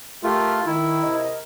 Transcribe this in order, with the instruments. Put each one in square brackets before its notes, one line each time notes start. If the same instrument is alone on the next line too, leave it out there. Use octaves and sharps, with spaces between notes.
[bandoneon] A3 F4 [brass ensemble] G4 A#4
[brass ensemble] D#3 [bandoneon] E4
[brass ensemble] C3 A#4 D#5